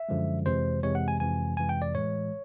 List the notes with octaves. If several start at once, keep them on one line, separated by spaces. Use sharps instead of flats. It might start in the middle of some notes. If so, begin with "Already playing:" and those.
Already playing: E5
F#2 D3 F3 G#3
F2 C3 E3 G#3 C5
F2 C3 E3 G#3 C#5
F#5
G#5
F2 C3 E3 G#3 G#5
F2 C3 E3 G#3 G#5
G5
D5
A2 E3 G#3 C#5